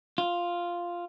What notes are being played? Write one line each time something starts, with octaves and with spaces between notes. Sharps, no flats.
F4